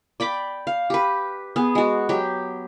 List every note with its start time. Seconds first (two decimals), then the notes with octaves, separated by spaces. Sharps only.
0.20 D5 G5 B5 D6
0.67 F5
0.90 G4 B4
1.56 B3 G#4
1.75 G#3 F#4
2.09 F#3 G4